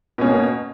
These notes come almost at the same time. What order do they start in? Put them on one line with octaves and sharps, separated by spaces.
B2 C#4 A#3